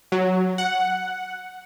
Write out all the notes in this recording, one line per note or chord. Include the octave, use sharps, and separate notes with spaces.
F#3
F#5